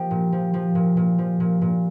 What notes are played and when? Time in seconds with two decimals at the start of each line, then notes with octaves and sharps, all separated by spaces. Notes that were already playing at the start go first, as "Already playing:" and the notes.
Already playing: F3 A#3 G4
0.11 A#2
0.32 F3
0.54 F3
0.75 A#2
0.97 A#2
1.18 F3
1.40 A#2
1.62 A#2